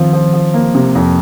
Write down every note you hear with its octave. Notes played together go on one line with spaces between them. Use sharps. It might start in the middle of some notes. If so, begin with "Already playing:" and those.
Already playing: D#3 F3 C4 F4
F3
F3
A#3
C3
F2